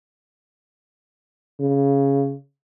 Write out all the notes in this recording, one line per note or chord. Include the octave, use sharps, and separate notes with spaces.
C#3